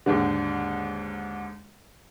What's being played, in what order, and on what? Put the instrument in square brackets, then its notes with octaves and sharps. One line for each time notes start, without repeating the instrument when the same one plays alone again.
[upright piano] D#2 G#2 D3